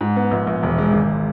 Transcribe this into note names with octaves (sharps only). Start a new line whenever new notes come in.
G#2
B3
A#1
A#1
E1
G#3
G#1